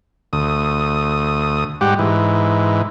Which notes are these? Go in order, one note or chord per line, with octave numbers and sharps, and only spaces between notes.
D2 D#6
G#2 G3 G4 F#5
G#2 E3